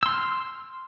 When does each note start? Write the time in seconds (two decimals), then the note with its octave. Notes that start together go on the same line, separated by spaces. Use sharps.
0.03 E6
0.06 C6
0.09 F6